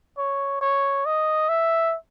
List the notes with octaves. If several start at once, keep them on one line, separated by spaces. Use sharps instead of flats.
C#5
C#5
D#5
E5